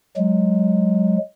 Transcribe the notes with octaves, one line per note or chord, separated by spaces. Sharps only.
F#3 G#3